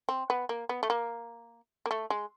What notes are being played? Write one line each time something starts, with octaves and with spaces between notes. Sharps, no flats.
C4
B3
A#3
B3
A3
A#3
A#3
A3
G#3